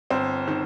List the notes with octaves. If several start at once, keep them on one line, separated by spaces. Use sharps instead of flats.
G1 C4
D#3